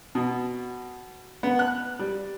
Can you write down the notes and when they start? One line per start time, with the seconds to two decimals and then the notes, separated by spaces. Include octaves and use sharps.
0.15 B2
1.43 B3
1.59 F#6
1.99 G3